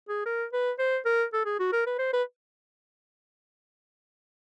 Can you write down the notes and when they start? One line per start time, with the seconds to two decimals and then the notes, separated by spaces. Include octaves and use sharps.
0.09 G#4
0.26 A#4
0.53 B4
0.79 C5
1.06 A#4
1.33 A4
1.45 G#4
1.60 F#4
1.73 A#4
1.87 B4
1.99 C5
2.13 B4